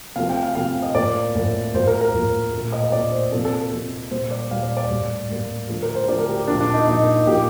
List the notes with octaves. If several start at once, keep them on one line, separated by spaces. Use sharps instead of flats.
C3 F3 A3 F5
G5
F5
C3 F3 A3 F5
D#5
A2 F3 A#3 D5
A2 F3 A#3
A2 F3 A#3 C5
A#4
A#4
A2 F3 A#3
A#2 A3
D#5
D#5
A#2 A3 D5
C5
C3 F3 A#3 A4
A4
A4
C3 F3 A#3
A#2 G3 A#3 C5
D5
A#2 G3 A#3 F5
D5
D5
A2 G3 A#3
A2 G3 A#3
D3 F3 A3
A#4
C5
D3 F3 A3 D5
A#4
G4
A#2 F3 A#3 D4
D4
D#4
A#2 F3 A#3 D#4
D#4
D#4
A#2 F3 A#3 G4